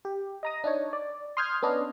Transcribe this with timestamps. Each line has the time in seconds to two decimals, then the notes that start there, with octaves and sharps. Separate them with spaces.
0.05 G4
0.43 D#5 A#5 D#6
0.64 D4 D#4 C#5
0.93 D5
1.37 C6 D#6 F6 G6 G#6
1.62 B3 C#4 D4 D#5